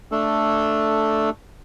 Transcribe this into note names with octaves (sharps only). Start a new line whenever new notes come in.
A3 D4 A4